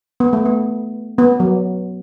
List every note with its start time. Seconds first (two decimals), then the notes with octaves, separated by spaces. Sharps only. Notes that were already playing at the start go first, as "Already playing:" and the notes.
0.20 B3
0.33 A3
0.45 B3
1.18 B3
1.40 F#3